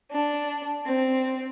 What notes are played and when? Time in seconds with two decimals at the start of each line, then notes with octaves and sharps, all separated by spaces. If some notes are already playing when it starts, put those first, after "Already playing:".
0.11 D4
0.87 C4